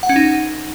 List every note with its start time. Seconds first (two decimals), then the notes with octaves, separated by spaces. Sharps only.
0.03 F#5
0.09 C#4
0.16 D#4